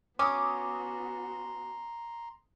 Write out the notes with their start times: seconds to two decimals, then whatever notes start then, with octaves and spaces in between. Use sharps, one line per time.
0.19 B3 C#4 F#4 A#5 C6 D6 D#6